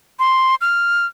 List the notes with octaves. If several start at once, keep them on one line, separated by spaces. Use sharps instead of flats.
C6
F6